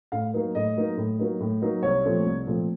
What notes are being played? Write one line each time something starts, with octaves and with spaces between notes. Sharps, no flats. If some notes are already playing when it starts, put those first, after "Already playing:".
A2 F5
F#3 A#3 D#4
A2 D#5
F#3 A#3 D#4
A2
F#3 A#3 D#4
A2
F#3 A#3 D#4
C2 C#5
A#2 F3 A3 C4
C2
A#2 F3 A3 C4